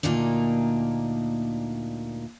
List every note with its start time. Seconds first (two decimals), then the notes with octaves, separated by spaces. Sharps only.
0.03 D2 A#2 A#3 D4 D#4